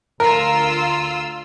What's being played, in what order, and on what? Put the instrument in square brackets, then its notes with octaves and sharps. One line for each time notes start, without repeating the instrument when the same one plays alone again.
[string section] D2 F4 E6 [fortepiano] A#4